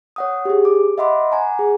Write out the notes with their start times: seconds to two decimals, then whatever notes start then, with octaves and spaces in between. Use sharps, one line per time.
0.16 C#5 F#5 D#6
0.45 G4 G#4
0.65 D6
0.98 D#5 E5 F#5 B5 C6 D6
1.31 F#5 G#5 A#5
1.59 G#4